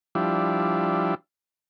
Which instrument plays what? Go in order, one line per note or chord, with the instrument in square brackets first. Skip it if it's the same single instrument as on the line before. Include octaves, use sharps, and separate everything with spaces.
[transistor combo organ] F3 G3 D4 E4